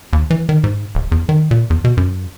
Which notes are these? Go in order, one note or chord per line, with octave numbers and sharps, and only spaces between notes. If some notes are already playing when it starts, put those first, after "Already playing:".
D#2
E3
D#3
G#2
D1
E2
D#3
A#2
E2
B2
F#2